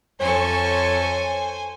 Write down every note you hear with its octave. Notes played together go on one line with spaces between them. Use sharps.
F2 A4 C5 C#5 G#5 C#6